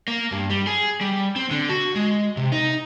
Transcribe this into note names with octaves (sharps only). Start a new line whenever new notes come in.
A#3
G2
G3
G#4
G3
C4
D3
F#4
G#3
C3
D#4